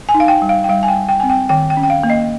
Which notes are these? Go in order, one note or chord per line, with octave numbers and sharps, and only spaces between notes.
G#5
D#4
F5
G5
G3
F5
G5
G3 F5
G#5
G5
G3
G5
C4 G#5
G5
D#3 G5
G5
C#4
G5
F5
A#3
D#5